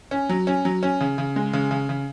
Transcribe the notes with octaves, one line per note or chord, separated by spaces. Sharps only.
C#4
F#3
C#4
F#3
C#4
C#3
C#3
G#3
C#3
C#3
C#3